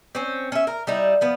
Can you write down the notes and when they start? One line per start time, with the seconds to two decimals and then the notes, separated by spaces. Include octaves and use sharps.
0.15 C4 C#4
0.52 C#4 E5
0.67 A#4
0.87 G3 D#4 E4
1.21 F3 B3